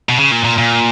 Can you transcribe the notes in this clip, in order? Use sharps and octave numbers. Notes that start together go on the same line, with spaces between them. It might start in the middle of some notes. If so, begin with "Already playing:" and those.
B2
C#3
A#2
A#2
A#2